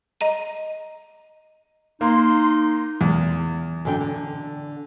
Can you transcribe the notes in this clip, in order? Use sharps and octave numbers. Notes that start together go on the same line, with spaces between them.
D#5 A#5 D#7
A#3 D#4 C6
E2
F#2 D3 G5
D3